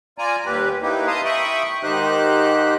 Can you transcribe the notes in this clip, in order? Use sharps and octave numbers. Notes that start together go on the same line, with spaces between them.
F4 D5 G#5 A#5
D#2 G3 G4 B4
A#3 C4 D#4 E4 G4 B4
F5 A5 A#5 C6 D#6
E5 G5 B5 C#6 D#6
G#2 D#3 D#4 G4 C5 F#6